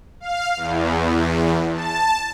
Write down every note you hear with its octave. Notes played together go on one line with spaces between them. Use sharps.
F5
E2
A5